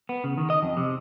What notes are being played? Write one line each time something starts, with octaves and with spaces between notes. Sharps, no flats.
B3
C#3
D#3
D#5
F2
C3